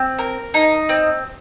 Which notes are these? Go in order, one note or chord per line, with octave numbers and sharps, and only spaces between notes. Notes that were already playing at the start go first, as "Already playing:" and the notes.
Already playing: C4
A#4
D#4
C4